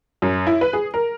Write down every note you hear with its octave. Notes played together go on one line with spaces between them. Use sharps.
F#2
E4
B4
G#4
A#4